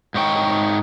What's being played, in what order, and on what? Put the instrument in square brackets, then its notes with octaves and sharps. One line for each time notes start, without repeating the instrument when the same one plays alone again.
[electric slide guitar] G#2 D#4 C#5 G5